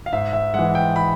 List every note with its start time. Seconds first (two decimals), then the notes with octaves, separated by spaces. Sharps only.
0.06 F5
0.13 G#2 E5
0.33 E5
0.54 E3 G#3 F#5
0.75 G5
0.96 B5